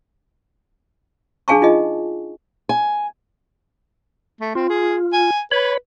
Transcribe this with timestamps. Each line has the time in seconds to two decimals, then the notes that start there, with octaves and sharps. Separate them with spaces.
1.48 D4 G#4 F5 G#5 A5 C#6
1.62 D#4 F4 G#4 D#5
2.69 G#5
4.41 A3
4.55 C4 F4
4.69 G#4
5.13 G#5
5.51 B4 C#5 B5